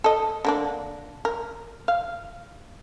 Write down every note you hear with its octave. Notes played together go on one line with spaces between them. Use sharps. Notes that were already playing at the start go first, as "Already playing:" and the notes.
A4 D#5
D3 A#3 D4
A#4
F5